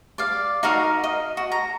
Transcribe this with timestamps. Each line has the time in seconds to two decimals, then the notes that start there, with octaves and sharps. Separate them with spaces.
0.18 D5 F5
0.63 D#4 F#4 A#4 F5
1.04 D#5
1.37 F#4
1.52 A#5